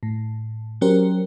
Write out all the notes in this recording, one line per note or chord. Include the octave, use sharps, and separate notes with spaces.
A2
F#3 C#4 G4 A#4 C5